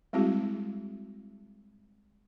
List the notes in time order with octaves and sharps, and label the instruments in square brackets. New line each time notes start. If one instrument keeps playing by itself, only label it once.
[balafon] G3 G#3 C4 E4 F#4 G#4